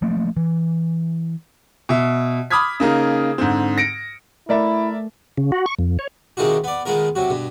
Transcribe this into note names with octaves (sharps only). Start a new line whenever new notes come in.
F3 A3 A#3
E3
B2 E5
B5 D6 D#6 F6 G#6 B6
C#3 A#3 D#4 G#4
G#2 D3 C4
A#6 C#7 D7
A3 E4 A#4 D5 E5
C#3
F#4
C#6
F2
C#5
C3 D#3 G#3 D#4 F4 F#4
B3 D5
D#3 G#3 B3 F4 A#4
C3 F#3 F#4
G2 B2